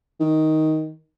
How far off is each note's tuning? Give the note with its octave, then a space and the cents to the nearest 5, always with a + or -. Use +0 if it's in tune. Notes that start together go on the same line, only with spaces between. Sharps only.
D#3 +10